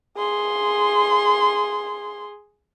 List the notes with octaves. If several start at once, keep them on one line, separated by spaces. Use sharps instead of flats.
G#4 C6